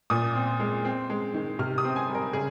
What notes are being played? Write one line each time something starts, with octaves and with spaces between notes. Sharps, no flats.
A#2 D#6
C4
G#3
C4
G#3
D#3
C3 F6
D#6
C4
G#5
G3
A#4
C#3 G#4